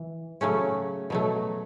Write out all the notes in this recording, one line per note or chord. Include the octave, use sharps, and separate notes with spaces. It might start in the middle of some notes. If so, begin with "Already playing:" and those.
Already playing: E3
C#3 F#3 A3 C#4
B2 F#3 A3